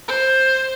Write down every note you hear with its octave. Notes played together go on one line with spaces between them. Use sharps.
C5